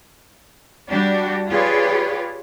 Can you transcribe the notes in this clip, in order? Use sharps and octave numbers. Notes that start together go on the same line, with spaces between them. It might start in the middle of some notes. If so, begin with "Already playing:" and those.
G3 D4 F#4 G4
F4 G4 G#4 B4 C#5 D5